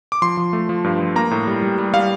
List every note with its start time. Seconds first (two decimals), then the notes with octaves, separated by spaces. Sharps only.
0.12 D6
0.22 F3 C6
0.37 F3
0.53 A3
0.69 F3
0.84 G2
1.00 F3
1.16 A#3 A#5
1.31 A2
1.47 G3
1.62 G3
1.78 G3
1.93 G3 F5